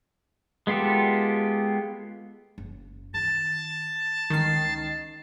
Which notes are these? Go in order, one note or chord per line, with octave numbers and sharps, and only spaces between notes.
G#3 B3 F4 G4 A4
F#1
D#3 A5
C#2 D#3 E4 C7